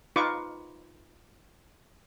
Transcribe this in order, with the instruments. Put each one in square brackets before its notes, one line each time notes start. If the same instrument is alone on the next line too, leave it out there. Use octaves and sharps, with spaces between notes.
[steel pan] D#4 F4 B4 C#6 D6